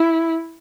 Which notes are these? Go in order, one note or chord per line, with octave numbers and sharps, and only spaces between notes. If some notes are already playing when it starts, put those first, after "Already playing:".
Already playing: E4